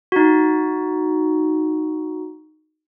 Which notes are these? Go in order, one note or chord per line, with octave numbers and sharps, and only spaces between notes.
D#4 F#4